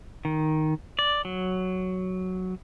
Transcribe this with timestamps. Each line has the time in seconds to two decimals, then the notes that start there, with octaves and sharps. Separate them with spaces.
0.25 D#3
0.99 D5
1.25 F#3